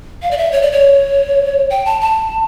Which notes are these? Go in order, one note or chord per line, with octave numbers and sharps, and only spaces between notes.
F5
D5
E5
C#5
D5
C#5
G5
A5
A5